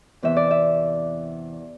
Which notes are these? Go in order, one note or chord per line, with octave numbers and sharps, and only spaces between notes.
E2 C3 E3 E5
D5
E5